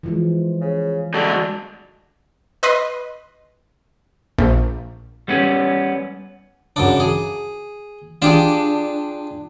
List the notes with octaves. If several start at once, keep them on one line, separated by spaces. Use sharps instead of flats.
E3 F3 G#3
C#3
D3 G#3 F#4 A4
B4 D#5 C6
A#1
G3 B3 C#4
F#2 C#3 D4
G#4
D4 F4 G4 G#4